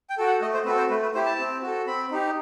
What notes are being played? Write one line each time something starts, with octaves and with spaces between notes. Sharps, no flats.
G5
F#4 A4
F#5
A3 D#5
C5
C4 F#4 A4 B4
C5
A3 B4
B4
E4 G4 C5
A5
C4
F#4 A4
C4 B5
D#4 G4